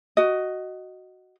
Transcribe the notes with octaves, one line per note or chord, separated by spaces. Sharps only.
F#4 D#5